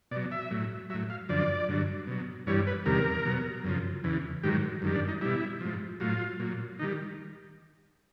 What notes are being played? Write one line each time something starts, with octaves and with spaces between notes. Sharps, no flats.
B2 F#3 D5
E5
A2 F#3
A2 F#3 E5
F5
F#2 D3 F3 D5
G2 D3 F#3
B2 F#3
G2 E3 G3 C#5
B4
E2 C3 D#3 G3 A#4
B2 F#3
F#2 C#3 F3
E2 C#3 E3
G#2 D#3 F#3 G4
F#2 D#3 G3
D4
D#4
B2 G3 E4
G#2 F3
A2 F#3 F4
A#2 F#3
D#3 G3 D#4